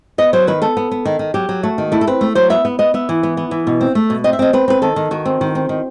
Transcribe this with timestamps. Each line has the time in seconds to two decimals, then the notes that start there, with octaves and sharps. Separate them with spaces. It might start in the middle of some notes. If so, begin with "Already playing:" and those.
0.18 B3 D#5
0.33 F#3 C5
0.47 D#3 B4
0.62 B3 A4
0.77 B3
0.91 B3
1.05 D#3
1.19 D#3
1.34 F#3 G4
1.49 F#3
1.63 A3 F#4
1.78 D#3
1.92 A3 E4
2.01 A4
2.07 C4 B4
2.21 A3
2.35 F#3 C5
2.50 B3 E5
2.65 B3
2.79 B3 D#5
2.94 B3 E5
3.09 E3
3.23 B3
3.37 B3
3.51 E3
3.67 B2
3.81 C4
3.95 A3
4.10 B2
4.24 C4 D#5
4.33 E5
4.39 C4 D#5
4.53 C4 B4
4.68 C4 B4
4.82 D#3 A4
4.96 D#3
5.11 D#3 F#4
5.26 C4
5.41 D#3
5.55 C4
5.69 D#3